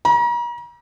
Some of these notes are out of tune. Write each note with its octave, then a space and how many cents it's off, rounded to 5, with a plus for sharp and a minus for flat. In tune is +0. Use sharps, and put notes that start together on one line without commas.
A#5 +40